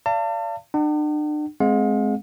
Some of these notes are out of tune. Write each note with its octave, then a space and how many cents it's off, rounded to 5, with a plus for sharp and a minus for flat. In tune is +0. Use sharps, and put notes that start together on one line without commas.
D5 -20 F5 -40 A5 +35
D4 +40 F#5 +45
G#3 +20 C4 +0 F5 +45